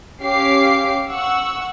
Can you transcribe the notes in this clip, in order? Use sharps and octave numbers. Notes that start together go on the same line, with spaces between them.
C#4 G4 F5 D6 C7
F#5 C#6 E6